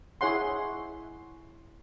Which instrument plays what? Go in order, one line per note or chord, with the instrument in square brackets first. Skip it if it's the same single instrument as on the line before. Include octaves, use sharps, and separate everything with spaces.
[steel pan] E4 G#4 C#5 F#5 C6